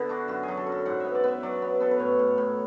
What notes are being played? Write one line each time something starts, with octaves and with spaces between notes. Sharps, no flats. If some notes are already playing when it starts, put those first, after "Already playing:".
Already playing: D3 B3 E4
D4 F#4
F#2 F#4
F#3 G#4
A4
F#2
A4
G#2 F#5
B3 E5
D5
B3 E5
F#3 D5
B3
B3 A4
B4
A2 C#5
A2
A2